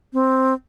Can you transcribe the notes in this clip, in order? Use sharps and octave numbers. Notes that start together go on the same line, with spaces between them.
C4